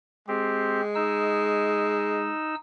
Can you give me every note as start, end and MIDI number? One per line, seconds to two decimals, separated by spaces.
0.28 2.32 56
0.28 0.81 60
0.28 0.81 67
0.95 2.55 63
0.95 2.55 88